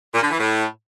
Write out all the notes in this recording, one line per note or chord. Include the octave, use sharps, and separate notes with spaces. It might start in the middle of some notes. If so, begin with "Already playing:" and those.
A#2
D3
E3
A2